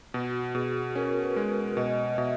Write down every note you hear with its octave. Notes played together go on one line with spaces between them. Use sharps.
B2 F#4
B2 G#4
C#4 A#4
B4
G#3
B2 D#5
B2 E5